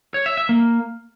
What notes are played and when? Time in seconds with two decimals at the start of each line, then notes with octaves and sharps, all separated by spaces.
0.14 C#5
0.26 E5
0.37 E5
0.49 A#3